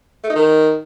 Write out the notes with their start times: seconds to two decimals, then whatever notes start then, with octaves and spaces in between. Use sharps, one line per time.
0.24 A3
0.30 D#4
0.35 D#3